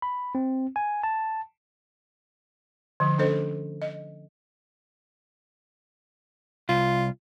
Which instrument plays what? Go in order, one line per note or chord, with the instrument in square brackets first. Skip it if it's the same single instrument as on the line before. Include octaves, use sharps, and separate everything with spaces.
[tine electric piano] B5
C4
G#5
A5
[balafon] D3 F3
A3 C#4 D4 A4 C5 D#5
D#5
[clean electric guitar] C2 [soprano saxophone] F4